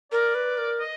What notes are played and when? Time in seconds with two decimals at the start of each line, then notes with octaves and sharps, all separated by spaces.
0.12 A#4 D5
0.35 B4
0.58 A#4
0.80 D#5